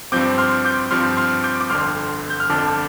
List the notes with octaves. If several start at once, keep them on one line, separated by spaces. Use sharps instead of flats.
G2 F3 C4 D6 G6
C6 F6
D6 G6
G2 F3 C4 C6 F6
C6 F6
D6 G6
D6
G1 F2 D3 C6 F6
G6
F6
G1 F2 D3 A5 D6